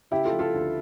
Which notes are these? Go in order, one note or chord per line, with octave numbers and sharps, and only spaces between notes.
C#3 E4 G4
F4 A4
F3
F4 A4
D2